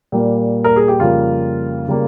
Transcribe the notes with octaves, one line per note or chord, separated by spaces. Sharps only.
A#2 G3 A#3
A#4
G#4
G4
F2 C#3 G3 A#3 F4
C#3 G3 A#3